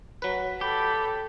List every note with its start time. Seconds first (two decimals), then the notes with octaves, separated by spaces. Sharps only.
0.22 F#3 B4 B6
0.61 G4 A4 B5